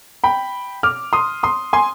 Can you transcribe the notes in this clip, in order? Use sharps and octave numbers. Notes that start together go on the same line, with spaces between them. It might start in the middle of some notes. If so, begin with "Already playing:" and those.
G5 B5
D6 F6
C6 D#6
C6 D#6
G#5 C6